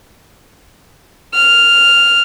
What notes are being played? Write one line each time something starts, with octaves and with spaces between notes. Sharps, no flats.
F6